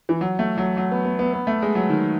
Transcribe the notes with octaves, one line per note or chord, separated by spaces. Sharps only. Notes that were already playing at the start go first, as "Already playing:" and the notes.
E3
F#3
A3
F#3
F#3
B3
B3
B3
B3
A3
G#3
F#3
D#3